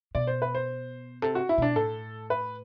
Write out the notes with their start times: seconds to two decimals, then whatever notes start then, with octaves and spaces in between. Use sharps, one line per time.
0.15 B2 D5
0.27 C5
0.42 B4
0.55 C5
1.22 C3 A4
1.35 F#4
1.49 E4
1.58 B2 D4
1.76 A2 A4
2.30 B4